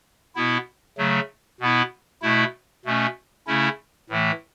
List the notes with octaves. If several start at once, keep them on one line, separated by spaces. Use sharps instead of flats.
B2 B3 E4
C#3 F#3 A3
B2 B3 E4
B2 A3 E4
B2 A3 C#4
C#3 A3 C#4 E4
A2 E3 A3